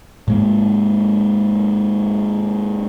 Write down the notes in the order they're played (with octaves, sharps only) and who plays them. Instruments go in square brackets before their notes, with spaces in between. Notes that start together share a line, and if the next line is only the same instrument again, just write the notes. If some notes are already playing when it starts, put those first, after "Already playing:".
[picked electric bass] G#2 G#3 A#3